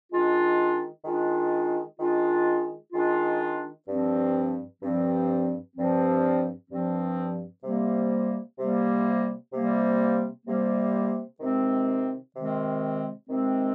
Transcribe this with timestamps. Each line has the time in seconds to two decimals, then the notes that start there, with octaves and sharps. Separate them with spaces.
0.11 D#3 G#3 D4 F4
1.05 D#3 G#3 D4 F4
1.99 D#3 G#3 D4 F4
2.93 D#3 G#3 D4 F4
3.88 G2 F3 C4
4.81 G2 F3 C4
5.76 G2 F3 C4
6.70 G2 F3 C4
7.63 C3 G3 A#3
8.58 C3 G3 A#3
9.52 C3 G3 A#3
10.46 C3 G3 A#3
11.40 C3 D#3 G#3 C4
12.35 C3 D#3 G#3 C4
13.29 C3 D#3 G#3 C4